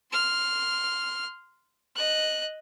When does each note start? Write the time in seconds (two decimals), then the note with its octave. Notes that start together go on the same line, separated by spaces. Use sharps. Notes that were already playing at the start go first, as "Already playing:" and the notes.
0.12 C6 F6
1.96 D#5 F#6